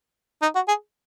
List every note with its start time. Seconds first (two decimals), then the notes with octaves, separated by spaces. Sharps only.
0.42 D#4
0.55 F#4
0.68 G#4